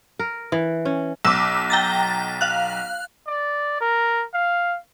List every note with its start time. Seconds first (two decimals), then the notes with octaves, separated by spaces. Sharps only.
0.19 A#4
0.52 E3
0.85 C#4
1.25 B1 D6 E6
1.70 G5 A#5 A6
2.41 F5 F#6
3.27 D5
3.81 A#4
4.34 F5